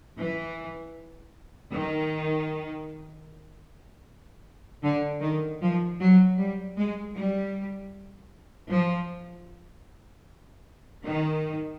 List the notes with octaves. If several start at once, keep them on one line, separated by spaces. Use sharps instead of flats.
E3
D#3
D3
D#3
F3
F#3
G3
G#3
G3
F3
D#3